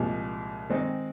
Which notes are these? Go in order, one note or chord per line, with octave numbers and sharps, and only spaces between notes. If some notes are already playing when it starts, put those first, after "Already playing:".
Already playing: C2 A#2 F3 G#3
D#3 G#3 C4 D#4